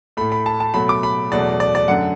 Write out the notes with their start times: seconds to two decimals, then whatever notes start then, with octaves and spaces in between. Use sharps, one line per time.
0.17 A2 A3 B5
0.32 B5
0.46 A5
0.60 A5
0.74 B2 F#3 A3 B5
0.89 D6
1.03 B5
1.32 E2 B2 F#3 A3 D5
1.60 D5
1.75 D5
1.88 F#2 D3 A3 F#5